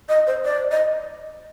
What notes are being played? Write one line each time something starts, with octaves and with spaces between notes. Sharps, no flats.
D#5
C5
D5
D#5